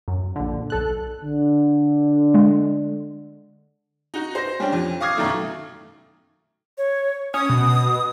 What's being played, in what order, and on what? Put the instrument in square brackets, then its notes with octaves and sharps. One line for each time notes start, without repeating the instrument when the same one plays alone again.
[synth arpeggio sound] F#2
A#1 D3
B1 A4 F#6
[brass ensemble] D3
[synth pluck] G#3
[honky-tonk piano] D#4 F#4
C5 A#6
G3 C#4 D4 G4
F2
F5 D6 D#6 F6 G#6 C7
F#2 B2 D#3 A3
[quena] C#5
[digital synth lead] C#4 [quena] D#6
[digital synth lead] B2